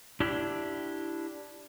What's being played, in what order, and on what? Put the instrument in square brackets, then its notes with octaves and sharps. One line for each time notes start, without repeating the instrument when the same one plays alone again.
[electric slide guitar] D4 E4 G4